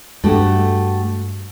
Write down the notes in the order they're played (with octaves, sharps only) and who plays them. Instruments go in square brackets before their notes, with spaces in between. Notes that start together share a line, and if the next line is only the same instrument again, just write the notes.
[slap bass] G2 [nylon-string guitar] A3 F#4 G4